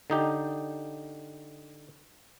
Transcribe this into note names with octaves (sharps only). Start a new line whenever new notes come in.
D3 D#4 G4